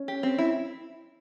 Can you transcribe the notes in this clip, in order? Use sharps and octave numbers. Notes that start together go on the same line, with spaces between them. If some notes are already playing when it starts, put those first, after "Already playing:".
Already playing: C#4
G4
C4
E4